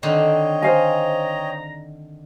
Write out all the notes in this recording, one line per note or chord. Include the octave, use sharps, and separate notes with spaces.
D3 D#3 C4 C#5 D#5 G5
C5 F5 G#5 A#5